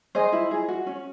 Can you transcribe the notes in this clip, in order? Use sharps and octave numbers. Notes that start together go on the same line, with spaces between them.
G#4 C5 D#5
E4
G#4
F#4
C#4